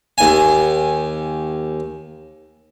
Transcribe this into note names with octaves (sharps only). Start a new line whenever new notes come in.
D#2 G#5